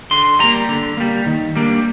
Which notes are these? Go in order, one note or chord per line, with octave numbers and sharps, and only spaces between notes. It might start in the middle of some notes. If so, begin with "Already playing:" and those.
D3 C6
G3 A#3 A#5
D3
G3 A#3
D#3
G3 A#3 D4